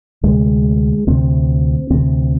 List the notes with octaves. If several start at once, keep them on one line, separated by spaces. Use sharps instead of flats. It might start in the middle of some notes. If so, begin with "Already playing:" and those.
D2 C3 G#3
D2 C3 C4
D2 C3 C4